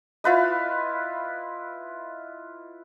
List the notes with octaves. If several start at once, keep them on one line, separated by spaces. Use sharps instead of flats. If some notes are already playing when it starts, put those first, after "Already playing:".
E4 F4 B4 D#5